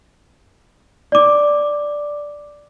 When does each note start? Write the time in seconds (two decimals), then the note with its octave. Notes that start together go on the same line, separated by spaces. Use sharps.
1.12 D5 D6